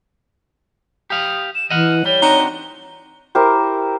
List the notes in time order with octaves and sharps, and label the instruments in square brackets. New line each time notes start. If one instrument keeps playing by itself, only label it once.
[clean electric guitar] G4 F5 [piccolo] D#6
[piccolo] E7
[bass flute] E3 [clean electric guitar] D#5 F#5 [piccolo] F6
[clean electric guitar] G3 [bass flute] C#5 [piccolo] G7
[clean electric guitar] C4 D4 F#4 [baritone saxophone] D#4
[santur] E4 G4 A#4 C5